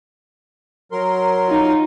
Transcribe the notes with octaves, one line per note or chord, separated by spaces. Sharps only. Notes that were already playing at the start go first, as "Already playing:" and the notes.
F#3 A#4 C6
D#4 F4